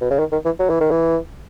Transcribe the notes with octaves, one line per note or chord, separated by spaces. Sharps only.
B2
C#3
D#3
D#3
E3
F#3
E3
D#3
E3